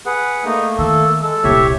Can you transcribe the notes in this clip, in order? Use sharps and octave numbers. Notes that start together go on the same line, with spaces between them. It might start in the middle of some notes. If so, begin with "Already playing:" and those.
G#4 B4 F#5
A3 A#3 D#4
D#3 A4
G#3 A4
D#1 C2 G4 C#5 E5